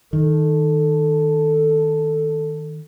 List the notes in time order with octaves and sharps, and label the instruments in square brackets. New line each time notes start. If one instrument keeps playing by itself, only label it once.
[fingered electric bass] D#3 [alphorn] A4